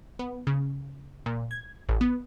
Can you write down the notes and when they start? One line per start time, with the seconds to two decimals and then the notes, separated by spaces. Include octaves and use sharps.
0.19 B3
0.47 C#3
1.26 A#2
1.51 G#6
1.89 A1
2.01 B3